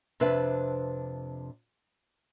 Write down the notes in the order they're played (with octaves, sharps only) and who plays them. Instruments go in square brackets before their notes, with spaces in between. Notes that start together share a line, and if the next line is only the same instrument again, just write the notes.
[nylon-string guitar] F2 C3 D4 B4 E5